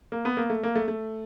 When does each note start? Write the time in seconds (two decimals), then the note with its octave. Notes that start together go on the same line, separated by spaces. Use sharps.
0.12 A#3
0.25 B3
0.37 A#3
0.50 A3
0.63 A#3
0.75 A3
0.88 A3